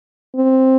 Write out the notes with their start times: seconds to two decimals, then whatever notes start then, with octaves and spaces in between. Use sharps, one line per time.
0.36 C4